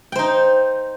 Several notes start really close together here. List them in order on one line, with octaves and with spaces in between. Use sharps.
G5 C5 D#4